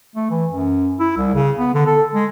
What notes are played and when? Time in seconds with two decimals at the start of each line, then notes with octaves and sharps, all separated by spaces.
0.16 A3
0.30 E3
0.51 F#2
1.00 E4
1.18 C2
1.34 C#3
1.58 B3
1.74 D3
1.86 A4
2.14 G#3